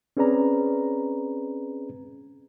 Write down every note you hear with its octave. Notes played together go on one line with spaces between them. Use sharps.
C4 C#4 G#4 B4 D5 A#5